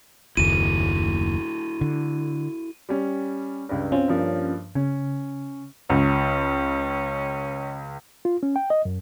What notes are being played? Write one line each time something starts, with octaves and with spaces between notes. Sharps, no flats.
F#1 D#2 E4 F#4 A4 D#7
D3
G3 C#4
C#2 G2
C4 C#4 F4
G2 F3 A#3
C#3 C#4
C#2 C#4
F4
C#4
G5
D#5
F#2